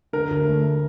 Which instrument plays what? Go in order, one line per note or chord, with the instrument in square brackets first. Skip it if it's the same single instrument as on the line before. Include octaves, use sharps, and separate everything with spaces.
[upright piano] D3 [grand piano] A#4
[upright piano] D2
A3